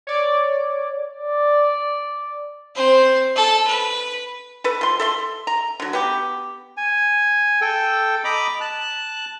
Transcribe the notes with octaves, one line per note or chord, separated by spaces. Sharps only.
C#5 D5 D6
D5
C4 C5
A4
B4
A4 B4
F3 C6
A4 E5 C6
A#5
D3 F#3
B3 G4
G#5
A4 G5
D#5 A#5 B5 D6
A5 F#6